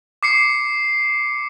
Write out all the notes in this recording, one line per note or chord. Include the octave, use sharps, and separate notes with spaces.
D6 C7 C#7